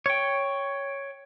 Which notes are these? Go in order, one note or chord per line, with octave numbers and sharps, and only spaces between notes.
C#5 G5